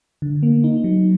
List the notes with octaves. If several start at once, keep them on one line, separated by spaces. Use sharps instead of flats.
D3
A#3
D#4
F#3